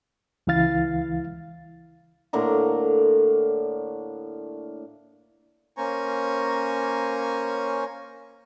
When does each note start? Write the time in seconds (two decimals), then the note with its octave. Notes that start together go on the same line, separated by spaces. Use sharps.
0.47 C#2 E3 E4 F5 A6
2.33 A2 D3 A#3 A#5
5.76 A#3 C#4 C5 G#5 A#5 C#6